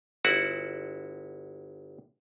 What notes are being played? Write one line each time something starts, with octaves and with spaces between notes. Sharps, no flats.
G1 E4 F#4 F#5